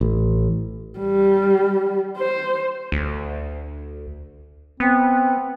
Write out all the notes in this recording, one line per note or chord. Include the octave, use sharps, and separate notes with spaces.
A1
G3
C5
D2
B3 C4